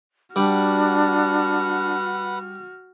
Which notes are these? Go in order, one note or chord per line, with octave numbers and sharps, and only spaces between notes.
G3 D4 F#4 B4 F#5 F6